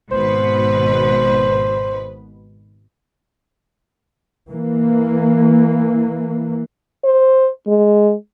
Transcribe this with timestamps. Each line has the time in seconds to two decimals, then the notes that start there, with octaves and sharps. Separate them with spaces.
0.12 G#1 B2 B4 C5
4.50 E3 A#3
7.04 C5
7.68 G#3